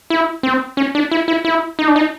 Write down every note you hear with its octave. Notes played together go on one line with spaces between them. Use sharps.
E4
C4
C#4
D4
E4
E4
E4
D#4
D4
D#4